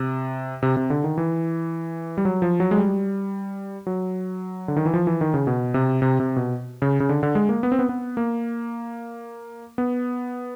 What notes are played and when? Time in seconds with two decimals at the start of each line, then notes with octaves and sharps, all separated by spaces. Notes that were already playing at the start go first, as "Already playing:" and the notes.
Already playing: C3
0.63 C3
0.77 C3
0.90 D3
1.04 D#3
1.18 E3
2.18 G3
2.25 F#3
2.42 F3
2.60 F#3
2.71 G#3
2.78 G3
3.87 F#3
4.68 D3
4.76 D#3
4.86 E3
4.94 F3
5.07 E3
5.21 D#3
5.34 C#3
5.47 B2
5.74 C3
6.02 C3
6.20 C3
6.36 B2
6.82 C#3
7.00 C#3
7.09 D3
7.23 D3
7.35 G#3
7.49 A#3
7.63 B3
7.72 C4
7.79 B3
7.89 B3
8.17 A#3
9.78 B3